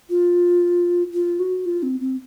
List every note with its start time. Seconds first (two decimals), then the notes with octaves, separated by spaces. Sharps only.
0.10 F4
1.14 F4
1.40 F#4
1.66 F4
1.83 C4
2.00 C4